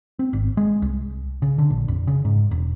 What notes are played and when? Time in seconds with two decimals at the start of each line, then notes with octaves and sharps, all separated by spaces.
0.19 C4
0.33 G#1
0.57 G#3
0.82 C2
1.42 C#3
1.58 D3
1.70 A#1
1.88 F1
2.07 C#3
2.25 G#2
2.51 E1